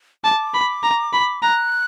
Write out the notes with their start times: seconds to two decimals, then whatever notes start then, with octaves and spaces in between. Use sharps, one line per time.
0.24 A5 D6
0.54 B5
0.83 A#5
1.13 B5
1.43 A#5 F#6